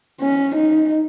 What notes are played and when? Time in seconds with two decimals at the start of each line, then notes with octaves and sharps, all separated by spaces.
0.21 C#4
0.55 D#4